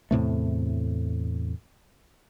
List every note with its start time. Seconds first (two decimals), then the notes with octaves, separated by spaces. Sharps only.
0.11 E2 A2 C3 A3